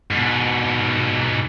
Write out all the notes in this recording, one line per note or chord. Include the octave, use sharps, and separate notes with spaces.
G#2 B2